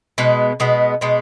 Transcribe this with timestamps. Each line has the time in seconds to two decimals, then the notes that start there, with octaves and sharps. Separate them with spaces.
0.18 B2 G#3 B3
0.60 B2 G#3 B3
1.01 B2 G#3 B3